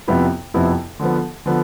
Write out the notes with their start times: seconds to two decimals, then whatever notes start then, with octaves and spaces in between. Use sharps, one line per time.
0.07 F2 C3 F3 B3 E4
0.54 F2 C3 F3 B3 E4
1.00 D3 F3 B3
1.46 D3 F3 B3